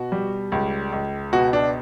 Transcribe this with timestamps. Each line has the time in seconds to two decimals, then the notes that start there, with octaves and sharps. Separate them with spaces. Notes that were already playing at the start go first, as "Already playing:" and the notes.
Already playing: B2 F#4
0.12 G3
0.52 C#2
0.92 C#2
1.33 B2 F#4
1.53 D4